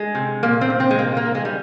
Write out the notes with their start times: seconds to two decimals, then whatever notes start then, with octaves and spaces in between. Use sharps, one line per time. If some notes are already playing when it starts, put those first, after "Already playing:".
Already playing: G#3
0.15 C3
0.43 A#2 A#3
0.61 C4
0.70 A#2
0.80 C4
0.91 G#3
0.98 C3 A#3
1.17 A#3
1.25 C3
1.35 G#3
1.45 G3